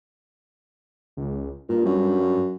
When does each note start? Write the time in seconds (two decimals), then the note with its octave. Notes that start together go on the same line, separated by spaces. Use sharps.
1.17 C#2
1.69 G2 A#2
1.86 F#2